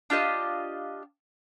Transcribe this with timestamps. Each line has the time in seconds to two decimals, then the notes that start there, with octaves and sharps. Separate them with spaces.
0.10 D4 F4 G4 D#5